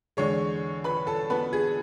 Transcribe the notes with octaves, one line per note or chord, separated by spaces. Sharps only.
E2 D3 G#3 C#5 C#6
B4 B5
A4 A5
B3 B4
G#4